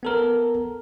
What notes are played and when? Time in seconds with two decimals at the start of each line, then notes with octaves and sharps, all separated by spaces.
0.03 B3 A4 A#4